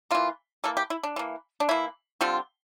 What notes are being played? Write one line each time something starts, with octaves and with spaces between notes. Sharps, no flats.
E3 A#3 F4
E3 A#3 A4
G4
E4
D4
E3 A#3
D4
E3 A#3 E4
D3 G3 C4 F4